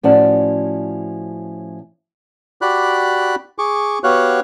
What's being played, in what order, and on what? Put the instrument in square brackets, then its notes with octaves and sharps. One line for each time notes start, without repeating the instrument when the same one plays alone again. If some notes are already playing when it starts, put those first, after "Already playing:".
[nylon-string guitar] A2 F3 C#4 F#4 D5 A5
[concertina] F#4 G4 D5 B5 F#6
G#4 C#6 D6
B3 F#4 G4 C#5 F5 F#6